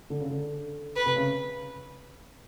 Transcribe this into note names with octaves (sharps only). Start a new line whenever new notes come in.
D3
C#3
D3
B4
C3
C#3